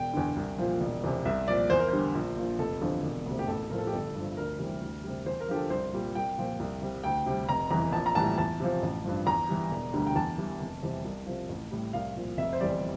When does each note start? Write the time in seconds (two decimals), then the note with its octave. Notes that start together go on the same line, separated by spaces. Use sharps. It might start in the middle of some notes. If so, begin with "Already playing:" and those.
Already playing: E1 G5
0.14 E2 D3
0.36 C2
0.59 A#2 F3
0.81 E1
1.04 E2 C3
1.25 C2 E5
1.48 A#2 F3 D5
1.70 E2 C5
1.79 A#4
1.88 D3 G3 C5
2.15 A#1
2.37 A#2 F3
2.59 F1 A4
2.81 E2 D3 F3
3.04 E1
3.25 D2 C3
3.39 G4
3.47 A1 A4
3.70 A2 F3 A#4
3.78 A4
3.87 G4
3.93 G1 A4
4.15 G2 F3
4.37 D2 A#4
4.59 C3 E3 G3
4.81 D2
5.04 C3 G3
5.26 E2 C5
5.41 A#4
5.49 D3 F3 G4
5.56 A4
5.70 C2 C5
5.93 A#2 G3
6.15 C2 G5
6.38 A#2 F3
6.59 C2
6.82 C3 G3
7.04 D2 G5
7.26 C3 G3
7.49 F1 A#5
7.71 E2 E3 A#5
7.93 A#1 A5
8.06 A#5
8.15 A2 E3 G3 A5
8.38 E2 A5
8.60 C3 F3
8.83 A1
9.05 G2 F3
9.26 E2 A#5
9.49 E3 G3
9.71 E1
9.93 D2 D3 G3
10.07 G5
10.15 E2 A5
10.38 E3 G3
10.60 F1
10.83 E2 C3 E3 G3
11.05 C2
11.26 C3 F3
11.49 A1
11.71 A2 G3
11.93 C2 F5
12.16 A#2 F3
12.37 F1 E5
12.53 C5
12.60 E2 E3 G3 D5